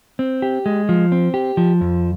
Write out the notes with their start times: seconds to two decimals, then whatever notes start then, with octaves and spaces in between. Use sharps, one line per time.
0.19 C4
0.42 G4
0.66 G#3
0.89 F3
1.12 C4
1.34 G4
1.57 F3
1.81 F2